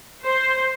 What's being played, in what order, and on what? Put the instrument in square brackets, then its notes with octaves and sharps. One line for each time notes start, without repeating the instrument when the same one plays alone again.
[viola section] C5